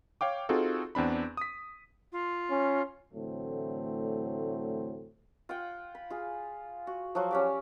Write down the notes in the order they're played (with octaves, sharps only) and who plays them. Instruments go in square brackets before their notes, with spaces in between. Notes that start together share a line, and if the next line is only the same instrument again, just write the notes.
[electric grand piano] C#5 F5 G5 D6
C4 D#4 F4 F#4 G#4 A4
E2 C4 D4 B5
D#6 B6
[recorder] F4
[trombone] C#4
[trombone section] A2 D3 E3 F#3 A3 C4
[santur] F4 F#5 G5
B5
F4 G#4
F#4
F3 F#3 F#4 C5
C#4 G4 D5